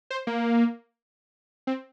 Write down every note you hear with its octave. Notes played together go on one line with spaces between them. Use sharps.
C5
A#3
C4